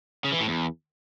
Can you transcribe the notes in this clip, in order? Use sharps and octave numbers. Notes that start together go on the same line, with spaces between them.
C#3
E3
A2
E2